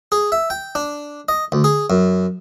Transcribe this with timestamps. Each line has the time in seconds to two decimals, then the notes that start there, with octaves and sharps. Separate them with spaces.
0.12 G#4
0.32 E5
0.50 G5
0.75 D4
1.29 D#5
1.52 D2
1.64 G#4
1.90 F#2